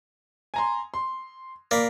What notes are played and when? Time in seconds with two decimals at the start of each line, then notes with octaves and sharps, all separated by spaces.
0.54 G#5 A#5 C6
0.94 C6
1.71 A#3 D5 B5